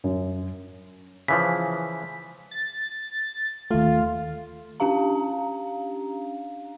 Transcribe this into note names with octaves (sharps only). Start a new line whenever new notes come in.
F#2
C#3 E3 F3 B6
A6
D#2 A3 F4
C#4 D4 G4 F5 A#5